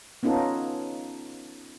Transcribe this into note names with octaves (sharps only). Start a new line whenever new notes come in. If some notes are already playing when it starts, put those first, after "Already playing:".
B3 C#4 D#4 F4 A4